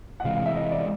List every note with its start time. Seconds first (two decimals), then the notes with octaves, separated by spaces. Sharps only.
0.20 F#5
0.24 C3 E3 G#3 F5
0.35 F5
0.46 E5
0.55 D#5
0.71 D5